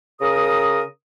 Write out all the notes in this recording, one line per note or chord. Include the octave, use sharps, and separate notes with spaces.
C#3 A#4 D#6